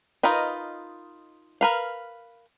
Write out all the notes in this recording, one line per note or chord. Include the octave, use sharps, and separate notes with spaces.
D#4 F4 A#4 B4 D#5
A#4 B4 F5